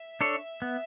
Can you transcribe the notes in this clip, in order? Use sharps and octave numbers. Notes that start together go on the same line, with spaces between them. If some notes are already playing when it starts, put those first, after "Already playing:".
Already playing: E5
D4 A4 C#5
B3